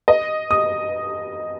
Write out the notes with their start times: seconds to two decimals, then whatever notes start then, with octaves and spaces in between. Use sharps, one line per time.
0.08 D#5
0.51 D#6